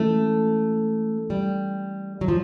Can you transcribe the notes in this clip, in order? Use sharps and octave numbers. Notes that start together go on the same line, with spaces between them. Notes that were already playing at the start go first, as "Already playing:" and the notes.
Already playing: E3 G#3 A3 C#4 E4
G3
F#3
F3